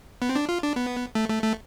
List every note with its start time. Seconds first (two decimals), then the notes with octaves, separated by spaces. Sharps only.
0.22 B3
0.29 C4
0.36 D4
0.49 F4
0.63 D4
0.76 B3
1.15 A3
1.30 A3
1.43 A3